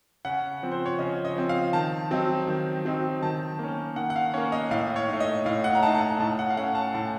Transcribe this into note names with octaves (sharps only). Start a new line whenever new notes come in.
C#3 F#5
F3 C4
C5
C#5
C#3 D#5
D#5
F3 C4
F5
D#3 A5
F#3 C4 D#4
D#3
F#3 C4 D#4
D#3 A5
A#3 C#4
D#3 F#5
F#5
F5
A#3 C#4 C#5
D#5
A2 F5
C#5
A3 D#4
D#5
A2 F5
F#5
A#5
A3 D#4 A5
A5
A#5
A2 A5
F#5
F5
A3 C#4 F#5
A5
A2 A5